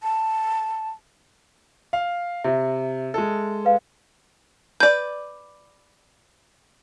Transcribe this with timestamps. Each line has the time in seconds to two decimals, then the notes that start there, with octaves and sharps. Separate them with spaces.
0.03 A5
1.93 F5
2.44 C3 E5
3.14 G#3 A4
3.65 B4 F5
4.80 B4 D5 G6